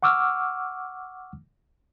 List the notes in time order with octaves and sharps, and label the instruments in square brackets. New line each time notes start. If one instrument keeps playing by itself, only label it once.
[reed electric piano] F#5 C#6 D6 E6 F6